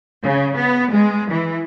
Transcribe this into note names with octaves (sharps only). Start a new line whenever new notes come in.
C#3
B3
G#3
E3